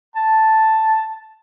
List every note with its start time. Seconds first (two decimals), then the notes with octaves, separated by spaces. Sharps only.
0.15 A5